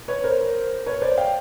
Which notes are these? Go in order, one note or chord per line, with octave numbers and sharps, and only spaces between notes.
B4 C#5
A#4 C5
B4 C#5
C5 D5
F5 G5